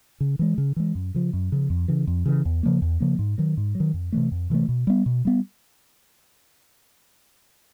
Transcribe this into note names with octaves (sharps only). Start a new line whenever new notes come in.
C#3
E3 G#3
C#3
E3 G#3
F#2
C#3 F3
F#2
C#3 F3
F2
C#3 E3
F2
C#3 E3
E2
C#3 F3 A#3
E2
C#3 F3 A#3
G#2
D#3 F#3
G#2
F#3
D#3
F2
C3 E3 A3
F2
C3 E3 A3
B2
G3 B3
B2
G3 B3